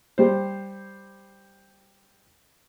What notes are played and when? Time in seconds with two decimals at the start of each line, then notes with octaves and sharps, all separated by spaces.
0.18 G3 C5